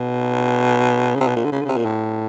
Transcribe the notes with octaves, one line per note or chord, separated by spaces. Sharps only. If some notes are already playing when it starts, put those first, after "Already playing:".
Already playing: B2
C#3
C3
B2
A#2
D3
C#3
D3
C#3
C3
A#2
A2